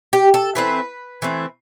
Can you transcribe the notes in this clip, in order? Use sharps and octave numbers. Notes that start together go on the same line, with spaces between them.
G4
A4
E3 A3 C4 B4
E3 A3 C4